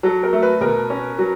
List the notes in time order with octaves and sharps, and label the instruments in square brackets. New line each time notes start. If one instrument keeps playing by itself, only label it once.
[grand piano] F#3 [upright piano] A4
[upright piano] A#4
[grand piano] A3
[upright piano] B4
[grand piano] B2 [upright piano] A#4
[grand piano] C#4
F#3